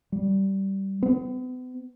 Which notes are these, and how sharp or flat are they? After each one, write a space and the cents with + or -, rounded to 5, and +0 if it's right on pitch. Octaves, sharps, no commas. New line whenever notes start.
G3 -15
B3 +40